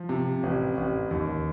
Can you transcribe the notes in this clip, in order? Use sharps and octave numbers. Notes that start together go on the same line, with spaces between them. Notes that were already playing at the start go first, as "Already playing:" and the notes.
Already playing: F3
C3
A1
A1
D#2